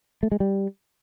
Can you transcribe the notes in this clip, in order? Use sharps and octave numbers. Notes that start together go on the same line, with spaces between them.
A3
G#3
G3